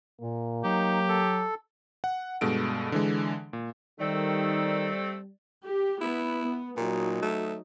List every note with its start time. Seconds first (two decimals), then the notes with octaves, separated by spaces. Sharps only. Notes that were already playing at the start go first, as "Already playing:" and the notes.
0.21 A#2 A#3
0.64 F#3 D#4 G4
1.08 A4
2.04 F#5
2.41 G2 B2 G#3 A4 D7
2.92 D3 E3 G#3
3.53 A#2
4.00 D#3 G3 A3 C4 A4 D5
5.64 G4
6.01 B3 E4
6.41 B3
6.77 A#2 F#3 D#4
7.22 A3